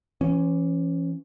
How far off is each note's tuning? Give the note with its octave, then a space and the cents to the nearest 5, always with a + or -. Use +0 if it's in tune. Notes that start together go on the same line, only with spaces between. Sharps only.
E3 +35 C#4 -10